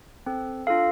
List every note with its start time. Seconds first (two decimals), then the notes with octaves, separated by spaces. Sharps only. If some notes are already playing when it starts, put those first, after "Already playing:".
0.26 C4 A4
0.67 D4 F4 A4 F5